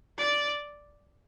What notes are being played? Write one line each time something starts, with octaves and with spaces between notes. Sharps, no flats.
D5